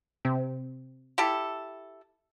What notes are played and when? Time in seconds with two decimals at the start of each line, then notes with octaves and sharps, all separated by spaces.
0.25 C3
1.18 E4 G4 A4